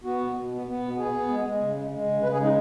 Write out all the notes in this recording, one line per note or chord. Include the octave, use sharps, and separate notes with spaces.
B3 F#4
B2
B2
B3
B3
B2
B3 G#4
B3
G#3
G#3
C#3
G#3
G#3
C#3
C#3 B4
G#4
G#3
D#4